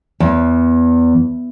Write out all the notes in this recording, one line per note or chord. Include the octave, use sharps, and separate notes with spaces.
E2